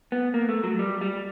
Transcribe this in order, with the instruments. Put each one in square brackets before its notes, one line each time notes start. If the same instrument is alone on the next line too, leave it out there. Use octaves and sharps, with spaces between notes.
[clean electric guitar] B3
A#3
A3
F#3
G3
G3